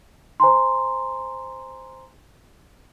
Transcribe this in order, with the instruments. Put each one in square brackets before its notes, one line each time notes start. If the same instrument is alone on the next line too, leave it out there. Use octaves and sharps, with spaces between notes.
[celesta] C5 G#5 A#5 C6